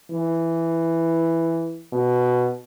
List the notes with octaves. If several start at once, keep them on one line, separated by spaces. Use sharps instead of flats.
E3
B2